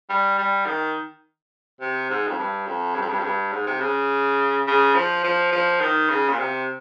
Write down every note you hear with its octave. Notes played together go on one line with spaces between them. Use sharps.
G3
G3
D#3
C3
G#2
F2
G2
F2
G2
F2
G2
F2
G2
G#2
C3
C#3
C#3
F3
F3
F3
D#3
C#3
A#2
C3